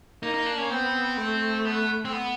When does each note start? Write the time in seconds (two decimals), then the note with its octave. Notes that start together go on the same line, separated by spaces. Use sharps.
0.22 A#3 D#4
0.34 D#4
0.46 D4
0.58 C#4
0.70 B3 C4
1.17 A3
1.65 B3
2.05 C4
2.12 B3